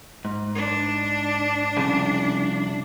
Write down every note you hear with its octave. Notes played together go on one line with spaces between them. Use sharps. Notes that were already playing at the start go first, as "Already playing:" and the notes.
G#2
D4
C2 F2 C#3